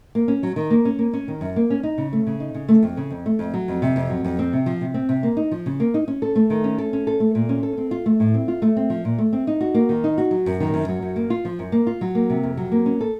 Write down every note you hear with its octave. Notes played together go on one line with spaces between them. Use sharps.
A#3
C#4
F#3
D#3
A#3
C#4
A#3
C#4
D#3
F#2
A#3
C#4
D#4
C#3
A3
C#3
D#4
C#3
A3
F2
C#3
F2
A3
F2
F#3
F2
C3
F2
F#3
F2
C4
C3
F3
C3
C4
C3
A#3
D#4
F3
C#3
A#3
D#4
C#4
A4
A3
D#3
C#4
A4
C#4
A4
A3
A#2
C#4
A4
C4
F4
A3
A2
C4
F4
A3
C4
F3
A#2
A3
C4
D#4
F#4
A#3
D#3
D#4
F#4
F#3
F#2
D#3
F#2
F#3
F#2
A#3
F4
F3
F#2
A#3
F4
F#3
A#3
C3
F2
F#3
A#3
C#4
A4